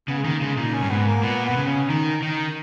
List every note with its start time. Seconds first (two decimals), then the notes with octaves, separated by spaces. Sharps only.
0.08 C#3 B3
0.19 G#3
0.25 D#3 A#3
0.41 C#3 G#3
0.57 A#2 D#4
0.73 C#4
0.83 G2
0.90 G#2 B3
1.06 A#3
1.23 A#2 B3
1.45 B3
1.51 B2
1.57 C#3
1.67 C#4
1.89 D#3 D#4
2.22 D#3 D#4